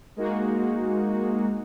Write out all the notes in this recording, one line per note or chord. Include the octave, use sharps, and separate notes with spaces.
G#3 A#3 D#4 F#4